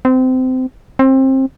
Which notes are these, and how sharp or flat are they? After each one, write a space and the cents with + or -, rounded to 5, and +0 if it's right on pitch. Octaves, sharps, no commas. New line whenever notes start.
C4 -25
C4 +25